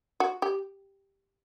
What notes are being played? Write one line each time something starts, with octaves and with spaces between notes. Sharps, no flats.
F#4
G4